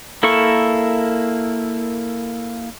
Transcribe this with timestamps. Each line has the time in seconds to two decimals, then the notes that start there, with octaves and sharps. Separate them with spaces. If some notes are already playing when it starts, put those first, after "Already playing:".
0.23 A#3 E4 A4 A#4 C#6